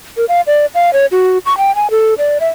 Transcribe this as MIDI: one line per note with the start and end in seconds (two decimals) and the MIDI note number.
0.17 0.25 70
0.29 0.41 77
0.47 0.66 74
0.75 0.93 77
0.93 1.06 73
1.12 1.38 66
1.46 1.57 85
1.58 1.74 79
1.76 1.90 80
1.91 2.14 69
2.18 2.38 74
2.40 2.49 76